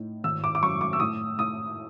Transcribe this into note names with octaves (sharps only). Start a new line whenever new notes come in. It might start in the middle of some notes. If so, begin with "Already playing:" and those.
Already playing: A2 D#4
G#1 E6
D6
D6
F#2 C#6
D6
E6
A2 D#6
A2 D#6